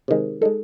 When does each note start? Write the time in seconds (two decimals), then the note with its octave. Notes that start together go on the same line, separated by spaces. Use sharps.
0.08 C3 D#3 G#3
0.42 G#3 D#4 A4